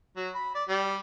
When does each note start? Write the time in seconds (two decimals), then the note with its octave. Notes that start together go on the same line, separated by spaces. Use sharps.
0.16 F#3
0.35 B5
0.55 D5
0.69 G3